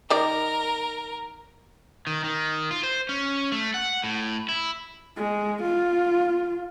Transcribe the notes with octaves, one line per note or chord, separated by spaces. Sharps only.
D#3 A#4 D5
D#3
D#3
F4
C5
C#4
A3
F#5
A2
E4
G#3
F4